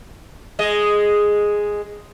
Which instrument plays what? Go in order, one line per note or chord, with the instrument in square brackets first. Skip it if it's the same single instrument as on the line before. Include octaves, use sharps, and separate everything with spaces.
[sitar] G#3 D#5